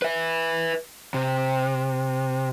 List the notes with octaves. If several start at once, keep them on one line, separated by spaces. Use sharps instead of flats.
B4 E5
C3